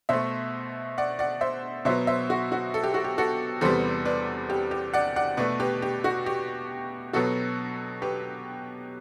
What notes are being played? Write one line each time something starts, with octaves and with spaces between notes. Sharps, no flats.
B2 A3 C5 E5
D5 F#5
D5 F#5
C5 E5
B2 F#3 B3 C5 E5
C5 E5
F#4
F#4
A4
G4
F#4
G4
F#4 A4
E2 C3 G3 B3 A4 C5
B4 D5
G4
G4
D5 F#5
D5 F#5
B2 A3 B4 D5
G4 B4
G4
F#4
G4
B2 F#3 B3 F#4 A4
G4 B4